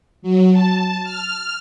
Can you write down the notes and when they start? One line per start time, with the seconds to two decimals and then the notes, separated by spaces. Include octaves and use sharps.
0.22 F#3
0.52 A5
1.03 F6